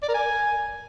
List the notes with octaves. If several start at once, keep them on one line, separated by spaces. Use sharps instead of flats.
D5
A#4
G#5